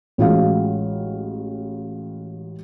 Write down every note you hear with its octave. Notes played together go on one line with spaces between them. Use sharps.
A1 G#3 F4 F#4 F5